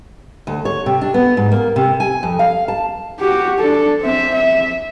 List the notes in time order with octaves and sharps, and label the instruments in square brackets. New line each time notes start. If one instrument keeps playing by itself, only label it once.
[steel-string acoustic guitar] D2
C#5
C3
D4
B3
G#2
A#3
C3
G#5
F2
F5
A5
[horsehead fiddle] F#4 G4
D4 A4
C4 E5
E5